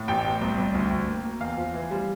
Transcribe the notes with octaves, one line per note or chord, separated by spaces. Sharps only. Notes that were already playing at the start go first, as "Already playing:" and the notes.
Already playing: A2
A1 G5
A1
C2
C2
D2
D2
A#3
A#3
E2 F5
F3
E3
G3